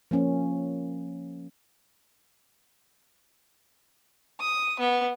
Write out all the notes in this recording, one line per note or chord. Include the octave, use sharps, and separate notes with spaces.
F3 A#3 C#4
D#6
B3